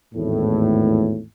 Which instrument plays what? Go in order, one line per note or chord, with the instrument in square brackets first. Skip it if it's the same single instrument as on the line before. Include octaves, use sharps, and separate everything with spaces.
[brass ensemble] G#1 E2 A2